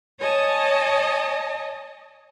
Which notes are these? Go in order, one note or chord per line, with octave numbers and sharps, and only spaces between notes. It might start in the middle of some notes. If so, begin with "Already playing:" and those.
C#5 D#5 G#5 A5